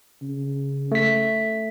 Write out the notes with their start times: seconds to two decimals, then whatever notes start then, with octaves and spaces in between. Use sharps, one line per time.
0.22 C#3
0.92 A3 B6